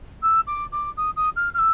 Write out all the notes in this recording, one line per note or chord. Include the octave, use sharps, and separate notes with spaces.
E6
D6
D6
D#6
D#6
F6
F6
E6